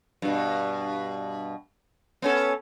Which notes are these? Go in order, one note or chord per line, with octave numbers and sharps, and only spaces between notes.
G2 B2
B3 C#4 A4